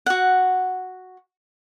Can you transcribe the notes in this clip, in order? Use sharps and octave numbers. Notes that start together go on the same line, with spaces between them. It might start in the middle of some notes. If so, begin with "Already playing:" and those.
F#4 F#5